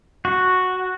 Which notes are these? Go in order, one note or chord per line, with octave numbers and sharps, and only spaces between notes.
F#4